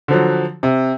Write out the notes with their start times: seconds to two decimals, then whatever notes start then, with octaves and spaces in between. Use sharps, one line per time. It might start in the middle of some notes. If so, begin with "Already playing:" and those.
0.08 D3 F3 F#3
0.63 C3